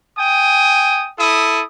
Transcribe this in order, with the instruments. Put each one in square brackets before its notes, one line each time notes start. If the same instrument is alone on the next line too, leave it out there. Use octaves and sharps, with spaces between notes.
[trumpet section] G5 G#5 D#6
E4 A4 D#6